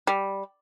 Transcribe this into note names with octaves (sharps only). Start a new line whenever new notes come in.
G3